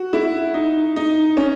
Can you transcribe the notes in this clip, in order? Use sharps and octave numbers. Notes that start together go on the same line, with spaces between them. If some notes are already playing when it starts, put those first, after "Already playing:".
Already playing: F#4
E4
D#4
D#4
C#4